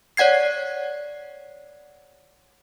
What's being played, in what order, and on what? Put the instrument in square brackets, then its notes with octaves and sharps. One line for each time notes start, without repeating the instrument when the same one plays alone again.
[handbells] C#5 D5 F#5 G#6 C7